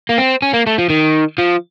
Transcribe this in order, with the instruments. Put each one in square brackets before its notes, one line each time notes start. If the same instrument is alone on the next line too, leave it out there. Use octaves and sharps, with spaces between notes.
[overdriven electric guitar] A#3
C4
C#4
A#3
A3
F3
D#3
F3